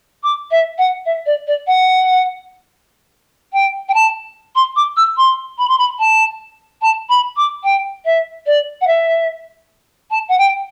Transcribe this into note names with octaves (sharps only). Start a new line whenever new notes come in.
D6
E5
F#5
E5
D5
D5
F#5
G5
G5
A5
C6
D6
E6
C6
B5
C6
B5
A5
A5
B5
D6
G5
E5
D5
F#5
E5
A5
F#5
G5